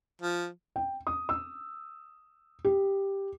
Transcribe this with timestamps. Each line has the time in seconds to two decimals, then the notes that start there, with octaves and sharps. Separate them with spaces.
0.22 F3
0.76 G5
1.07 D#6
1.29 E6
2.65 G4